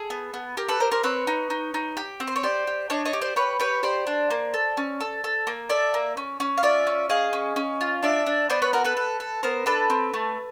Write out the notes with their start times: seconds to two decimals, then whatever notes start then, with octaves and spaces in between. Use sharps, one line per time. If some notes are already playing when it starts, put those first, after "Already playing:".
Already playing: G#4 A4
0.10 B3
0.34 B3
0.57 G4 A#4
0.68 A4 B4
0.80 G4 A#4 C5
0.91 A#4 C5
1.03 C4 B4 C#5
1.27 D#4
1.50 D#4
1.74 D#4
1.97 G4
2.20 C4
2.27 C5
2.36 C#5
2.43 G4 C5 D5
2.67 G4
2.90 D4 C#5 D#5
3.05 C#5 D#5
3.13 G4
3.21 C5 D5
3.36 G4 B4 C#5
3.60 G4 B4 C#5
3.83 G4 C5 D5
4.07 D4
4.30 A#3
4.54 A4
4.77 C#4
5.00 A4
5.24 A4
5.47 A#3
5.70 A4 D5 E5
5.94 A#3
6.17 C#4
6.40 C#4
6.58 F5
6.63 F4 D5 E5
6.87 C#4
7.09 G#4 D#5 F5
7.33 C#4
7.56 C#4
7.81 F4
8.03 D4 D5 E5
8.26 D4
8.50 B3 C5 D5
8.62 B4 C#5
8.73 F#4 A#4
8.84 A4 B4
8.97 A4
9.20 A4
9.43 B3 A#4 C5
9.66 D4 A4 B4
9.90 C4
10.14 A3